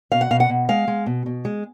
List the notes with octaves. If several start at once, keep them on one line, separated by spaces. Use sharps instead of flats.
B2 F5
F#5
B2 F5
F#5
B2
G#3 F5
G#3
B2
B2
G#3